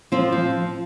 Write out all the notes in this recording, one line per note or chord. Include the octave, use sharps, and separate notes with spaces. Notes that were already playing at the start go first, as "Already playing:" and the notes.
F3 C4
F3